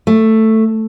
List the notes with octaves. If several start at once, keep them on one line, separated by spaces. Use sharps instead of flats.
A3